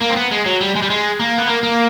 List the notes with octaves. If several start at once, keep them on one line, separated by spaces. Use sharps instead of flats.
A#3
C4
B3
G#3
F#3
G3
G#3
G3
G#3
A#3
B3
A#3
A#3